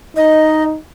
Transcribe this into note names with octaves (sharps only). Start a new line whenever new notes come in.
D#4 D#5